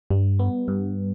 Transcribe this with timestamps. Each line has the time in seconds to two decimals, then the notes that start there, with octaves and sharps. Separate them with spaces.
0.10 G2 G3
0.39 B3
0.68 G2